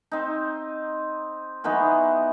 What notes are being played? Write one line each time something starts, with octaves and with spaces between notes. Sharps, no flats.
C4 D#4
E3 F#3 B3 D#4